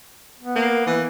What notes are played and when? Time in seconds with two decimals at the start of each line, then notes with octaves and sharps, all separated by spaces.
0.40 B3
0.56 A#3
0.87 E3